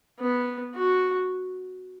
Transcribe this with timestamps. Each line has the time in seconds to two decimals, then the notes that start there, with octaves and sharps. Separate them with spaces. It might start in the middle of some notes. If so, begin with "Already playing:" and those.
0.21 B3
0.76 F#4